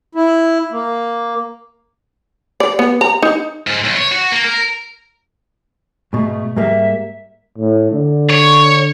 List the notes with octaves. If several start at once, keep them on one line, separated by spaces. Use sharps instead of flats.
E4
A#3
D5
B3
A#5
D#4
G#2
B1
C#5
F#4
A#3
A#4
G#2 B2 A3
G#2 G3 A#3 E5
A2
D3
C#5